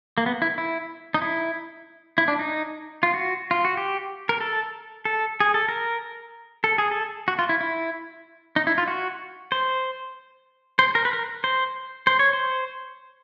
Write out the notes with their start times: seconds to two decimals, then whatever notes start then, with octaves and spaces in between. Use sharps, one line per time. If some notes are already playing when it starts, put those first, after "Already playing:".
0.18 A#3
0.26 B3
0.42 E4
0.58 E4
1.14 D#4
1.22 E4
2.18 E4
2.28 D4
2.39 D#4
3.03 F4
3.14 F#4
3.51 F4
3.65 F#4
3.77 G4
4.29 A#4
4.41 A4
5.05 A4
5.40 G#4
5.54 A4
5.69 A#4
6.64 A4
6.78 G#4
6.91 A4
7.28 F#4
7.39 F4
7.49 E4
7.61 E4
8.56 D#4
8.67 E4
8.78 F4
8.88 F#4
9.52 C5
10.79 C5
10.95 A#4
11.05 B4
11.13 A#4
11.44 C5
12.07 C5
12.19 C#5
12.33 C5